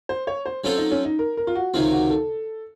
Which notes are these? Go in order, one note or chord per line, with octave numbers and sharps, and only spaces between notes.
C5
C#5
C5
F#3 C4 C#4 F4 A4 C5
D#4
C#4
D#4
A#4
A#4
F4
F#4
C#2 C3 D#3 F#3 C4 F4
F#4
A4